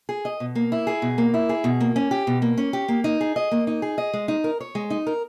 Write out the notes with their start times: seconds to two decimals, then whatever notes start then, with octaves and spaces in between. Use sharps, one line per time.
0.09 G#4
0.25 D#5
0.40 B2
0.56 A#3
0.72 E4
0.87 G#4
1.02 B2
1.18 A#3
1.34 E4
1.49 G#4
1.64 B2
1.81 A#3
1.96 C#4
2.11 G4
2.27 B2
2.42 A#3
2.58 C#4
2.73 G4
2.88 A#3
3.04 D#4
3.21 G#4
3.36 D#5
3.51 A#3
3.67 D#4
3.82 G#4
3.98 D#5
4.14 G#3
4.28 D#4
4.44 A#4
4.61 C#5
4.75 G#3
4.90 D#4
5.07 A#4